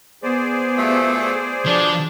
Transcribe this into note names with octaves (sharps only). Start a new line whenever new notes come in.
B3 G#4 C5 D5
B2 F3 A3
B2 D3 F3 D4